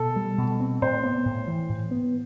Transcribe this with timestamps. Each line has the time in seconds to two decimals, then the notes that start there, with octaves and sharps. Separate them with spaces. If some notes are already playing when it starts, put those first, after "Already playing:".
Already playing: B2 A4
0.16 G3
0.38 B2
0.60 C4
0.82 A2 C5
1.04 B3
1.25 A2
1.47 E3
1.69 A2
1.91 B3